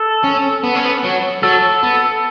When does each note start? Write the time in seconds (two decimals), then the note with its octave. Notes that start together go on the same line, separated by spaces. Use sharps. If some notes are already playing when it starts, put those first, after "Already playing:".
Already playing: A4
0.24 C#4
0.63 B3
0.75 C#4
0.85 B3
1.04 F#3
1.43 F#3 A4
1.83 B3